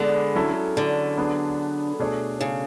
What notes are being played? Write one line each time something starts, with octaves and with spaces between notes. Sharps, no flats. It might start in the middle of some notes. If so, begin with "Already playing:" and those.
Already playing: D3 G#3 B3 D4
F#3 C#4 E4 A4
D3
F#3 B3 D4 G#4
B2 A3 D4 G#4 C#5
C#3